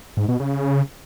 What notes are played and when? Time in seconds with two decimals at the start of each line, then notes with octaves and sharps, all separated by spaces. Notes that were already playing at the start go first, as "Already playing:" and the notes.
0.17 G#2
0.28 B2
0.40 C#3